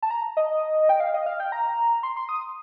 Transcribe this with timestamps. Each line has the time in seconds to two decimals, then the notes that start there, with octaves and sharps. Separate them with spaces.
0.02 A5
0.11 A#5
0.37 D#5
0.89 G5
1.00 F5
1.14 D#5
1.26 F5
1.40 G5
1.52 A#5
2.03 C6
2.17 C6
2.29 D#6